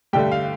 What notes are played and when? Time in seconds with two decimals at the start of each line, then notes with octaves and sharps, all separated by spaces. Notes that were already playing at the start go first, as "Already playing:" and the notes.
0.13 G2 D3 A3 G4 G5
0.32 F5